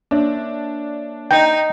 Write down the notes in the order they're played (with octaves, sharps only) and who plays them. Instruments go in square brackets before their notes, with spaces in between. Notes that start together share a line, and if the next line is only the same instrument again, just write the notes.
[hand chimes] A#3 C#5 E5 [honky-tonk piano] D4
[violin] D#4 [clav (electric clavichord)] G5